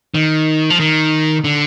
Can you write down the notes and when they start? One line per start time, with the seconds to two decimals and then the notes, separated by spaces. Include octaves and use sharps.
0.14 D#3
0.70 F3
0.79 D#3
1.44 D3